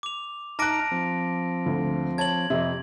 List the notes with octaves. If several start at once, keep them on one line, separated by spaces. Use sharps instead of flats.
D6 F7
D#4 A5 A#5 D6 F6 F#6 A#6 D7
F3 C4
D2
C#5 A5 G#6 F#7
F2 C3 E5